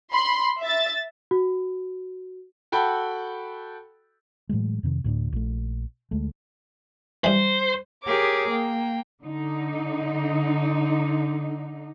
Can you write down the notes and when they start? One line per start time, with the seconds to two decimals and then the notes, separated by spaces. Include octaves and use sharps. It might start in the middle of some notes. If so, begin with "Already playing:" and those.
0.12 B5 C6
0.62 E5 A6
1.31 F#4
2.72 F#4 A4 G5 B5
4.49 A2 E3 F#3 G#3
4.83 F2 C3 D#3
5.04 D2 A2 C#4 D4
5.33 A#1 A3
6.11 D2 G#3 A3
7.24 G2 E3 C5
8.04 G4 G#4 A#4 C#5 D6
8.49 A#3 G5
9.23 D3 D#4